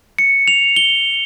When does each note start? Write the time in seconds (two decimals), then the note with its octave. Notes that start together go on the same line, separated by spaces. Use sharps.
0.19 C#7
0.48 F7
0.76 G7